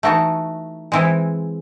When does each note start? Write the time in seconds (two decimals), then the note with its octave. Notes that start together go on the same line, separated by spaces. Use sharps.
0.03 E3 A3 D#4 F#4 A4
0.92 E3 G#3 C4 E4